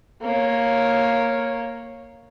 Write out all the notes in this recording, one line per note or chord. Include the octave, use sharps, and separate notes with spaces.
A#3 C#5